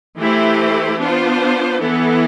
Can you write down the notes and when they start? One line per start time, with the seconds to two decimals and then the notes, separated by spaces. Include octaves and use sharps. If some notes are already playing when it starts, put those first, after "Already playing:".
0.17 E3 A3 E4 G4 C5
1.00 B3 D4 F4 C5
1.82 E3 B3 E4 A4